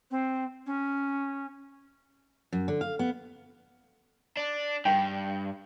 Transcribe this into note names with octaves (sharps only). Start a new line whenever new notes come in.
C4
C#4
F#2
D3
F5
B3
D4
G2 G5